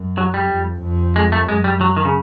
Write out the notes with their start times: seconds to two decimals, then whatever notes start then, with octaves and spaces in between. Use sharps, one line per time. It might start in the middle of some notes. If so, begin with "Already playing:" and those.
Already playing: F#2
0.18 F#3
0.34 G3
0.50 F2
0.82 F2
1.16 G#3
1.32 A3
1.48 F#2 G#3
1.64 G3
1.81 F#3
1.97 D#3
2.05 C#3